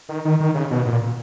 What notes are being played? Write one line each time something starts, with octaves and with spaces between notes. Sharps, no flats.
D#3
D#3
D#3
C#3
B2
A#2